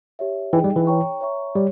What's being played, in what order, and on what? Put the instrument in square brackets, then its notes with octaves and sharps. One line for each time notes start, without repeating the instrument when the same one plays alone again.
[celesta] G4 C#5 E5
[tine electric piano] E3 [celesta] D#4 G#4 D#5 G5
[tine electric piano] G3
E3
[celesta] C#5 G5 A#5 C#6
C#5 E5 A#5 C#6
[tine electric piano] G3 [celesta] G4 C#5